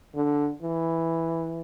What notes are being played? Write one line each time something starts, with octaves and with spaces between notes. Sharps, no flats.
D3
E3